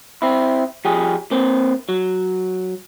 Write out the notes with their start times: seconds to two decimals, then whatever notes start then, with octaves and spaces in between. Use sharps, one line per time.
0.22 C4 E4
0.85 F3 G4 G#4
1.31 A#3 C4
1.89 F#3